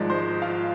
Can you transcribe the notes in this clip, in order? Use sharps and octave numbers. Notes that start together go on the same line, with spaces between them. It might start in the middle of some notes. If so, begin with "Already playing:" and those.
Already playing: G#1 G#2 F3 G#3 D5
C5 C6
F4 F5